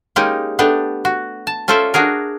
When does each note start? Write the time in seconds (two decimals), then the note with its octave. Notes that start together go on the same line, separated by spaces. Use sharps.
0.16 G#3 A#3 C#4 D#4 G4
0.59 A3 B3 D4 G4
1.05 F#4
1.47 A5
1.68 C#4 F4 A4 C5 D5 E5
1.94 D4 F#4 G#4 A#4